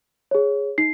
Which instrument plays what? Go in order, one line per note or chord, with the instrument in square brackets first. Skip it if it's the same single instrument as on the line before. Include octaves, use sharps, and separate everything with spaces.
[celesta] G#4 C#5
D#4 C7